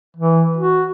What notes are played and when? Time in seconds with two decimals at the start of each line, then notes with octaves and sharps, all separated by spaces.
0.16 E3
0.57 F#4